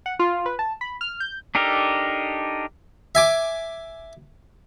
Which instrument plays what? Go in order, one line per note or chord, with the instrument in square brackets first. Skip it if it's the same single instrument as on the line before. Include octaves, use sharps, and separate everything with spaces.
[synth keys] F#5
F4
B4
A5
B5
F6
G6
[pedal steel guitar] D4 D#4 G4 A4 A#4
[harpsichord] E5 G#5 D6